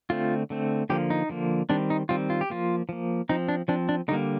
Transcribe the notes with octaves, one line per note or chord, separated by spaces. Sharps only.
D3 A3 C4 F4
D3 A3 C4
D3 F3 A#3 G4
D#4
D3 F3 A#3
D#3 G3 C4 D4
D#4
D#3 G3 C4 F4
F4
G4
F3 A#3 F4
F3 A#3
F3 C4 D#4
D4
F3 C4 D4
D4
D3 G3 A#3 D#4